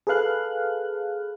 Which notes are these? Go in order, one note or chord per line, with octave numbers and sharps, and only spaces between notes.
G#4 A4 B4 F5 F#6